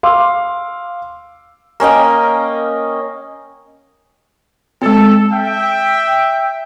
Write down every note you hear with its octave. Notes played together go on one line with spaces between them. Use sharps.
F5 C6 D6 E6
A#3 C#4 D#5 G5
G#3 C4 A4
E5 G5